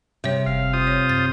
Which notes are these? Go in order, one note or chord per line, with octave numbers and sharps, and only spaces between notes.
C3 G3 C#5
F#1 F5
F4 C5 D#6
C#5
F#2 A6